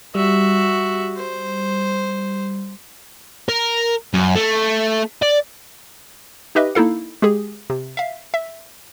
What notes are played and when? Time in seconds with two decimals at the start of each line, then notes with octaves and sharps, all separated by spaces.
0.15 G3 F#4 E5
1.17 C5
3.49 A#4
4.14 F#2
4.35 A3
5.22 D5
6.55 D#4 G4 B4 D#5 E5
6.75 A#3 D#4 E4 A4 F5
7.22 G#3 G4 G#4
7.70 C3
7.97 E5 F5
8.34 E5